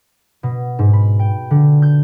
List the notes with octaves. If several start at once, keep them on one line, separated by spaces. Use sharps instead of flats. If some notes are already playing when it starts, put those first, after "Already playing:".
B2
G#2
B5
G5
D3
G6